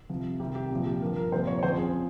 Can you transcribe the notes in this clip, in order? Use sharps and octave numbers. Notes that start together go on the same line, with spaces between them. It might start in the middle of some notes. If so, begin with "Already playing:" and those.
C2 C3 F3
C2 C3 D#3 G4
G4
C2 A#2 F3
G4
G2 F3 A#4
A#4
C2 A#2 F3 C5
C#5
C#5
F2 C#3 F3 C5
G#4